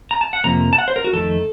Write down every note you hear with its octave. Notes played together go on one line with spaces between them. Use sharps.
A#5
A5
F#5
F2 C3 F3 A#3 A#5
A5
F#5
C5
A#4
F#4
F2 D#3 A3 A4